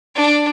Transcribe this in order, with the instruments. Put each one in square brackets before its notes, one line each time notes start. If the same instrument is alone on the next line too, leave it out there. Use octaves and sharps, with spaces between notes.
[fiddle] D4